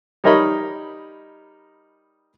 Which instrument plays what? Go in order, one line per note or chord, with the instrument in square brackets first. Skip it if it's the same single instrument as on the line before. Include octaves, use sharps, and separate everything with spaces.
[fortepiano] G3 D#4 A#4 C#5 D#5 B5